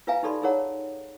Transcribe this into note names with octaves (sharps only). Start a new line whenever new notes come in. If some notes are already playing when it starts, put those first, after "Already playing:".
F4 B4 E5 F5 G#5 A#5
D#4 G4 A4 D5 B5 C6
D#4 G#4 A#4 C#5 F#5 A#5